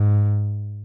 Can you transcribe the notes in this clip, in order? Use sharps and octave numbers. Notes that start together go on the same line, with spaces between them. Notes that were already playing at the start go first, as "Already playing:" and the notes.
Already playing: G#2